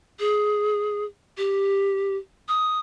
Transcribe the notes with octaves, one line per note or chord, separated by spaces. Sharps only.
G#4
G4
D#6